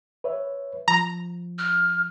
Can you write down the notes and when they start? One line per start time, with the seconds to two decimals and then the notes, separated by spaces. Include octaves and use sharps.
0.24 B4 C#5 E5
0.88 F3 A#5
1.58 F6